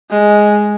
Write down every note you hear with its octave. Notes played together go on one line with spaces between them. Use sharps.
G#3